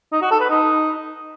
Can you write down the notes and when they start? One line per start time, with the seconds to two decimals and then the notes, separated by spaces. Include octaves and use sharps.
0.12 D#4
0.22 F#4
0.31 A4
0.40 B4
0.50 D#4